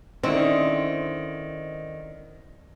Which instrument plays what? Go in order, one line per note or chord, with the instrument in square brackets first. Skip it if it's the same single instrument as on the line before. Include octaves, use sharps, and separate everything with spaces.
[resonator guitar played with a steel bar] D3 [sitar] D#3 [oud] C4 [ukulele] C#4 E4